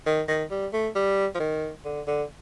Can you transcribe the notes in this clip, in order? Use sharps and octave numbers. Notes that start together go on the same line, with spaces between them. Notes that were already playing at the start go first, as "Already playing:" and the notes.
D#3
D#3
G3
A3
G3
F3
D#3
D3
D3